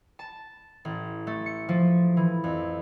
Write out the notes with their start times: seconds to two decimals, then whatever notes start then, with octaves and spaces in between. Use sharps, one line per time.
0.19 A5
0.85 A1
1.27 A3
1.46 C#7
1.69 F3
2.17 E3
2.44 F2